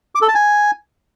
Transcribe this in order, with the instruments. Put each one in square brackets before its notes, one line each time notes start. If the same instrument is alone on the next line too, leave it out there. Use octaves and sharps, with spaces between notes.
[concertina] D6
A4
A5
G#5